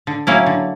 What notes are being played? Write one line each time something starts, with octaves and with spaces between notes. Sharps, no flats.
D3
F#3 A#3 C#4 E4
D3